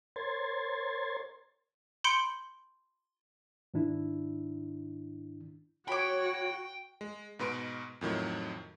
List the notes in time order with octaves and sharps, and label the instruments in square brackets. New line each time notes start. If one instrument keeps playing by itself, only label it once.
[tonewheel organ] A#4 C5 C#5 C6 G#6 A6
[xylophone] B5 C6 G6 C#7 D7 G7
[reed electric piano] G#2 D#3 D4 E4
[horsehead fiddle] F#4 [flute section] C#5 [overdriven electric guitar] G5 [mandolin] B5 D6
[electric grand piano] G#3
G#2 B2 B4 C6 D7
F2 A2 D#3 F#3